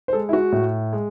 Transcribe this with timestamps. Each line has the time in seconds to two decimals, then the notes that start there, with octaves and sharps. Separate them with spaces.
0.08 C5
0.13 G#3 A4
0.29 E4
0.33 F#4
0.52 A2
0.93 G#3